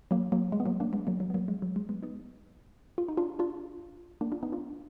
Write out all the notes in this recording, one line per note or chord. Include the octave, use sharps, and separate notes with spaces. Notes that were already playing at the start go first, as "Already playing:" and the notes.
F#3 A#3
F#3 A#3
G#3
B3
F#3 A#3
A#3 D4
G#3 B3
F#3 A#3
F#3
B3
F#3 A#3
G#3
F#3
G#3
G#3 B3
B3 D#4
F4
D#4
D4 F4
D4 F4
A#3 D4
D4 F4
B3 D#4
D4 F4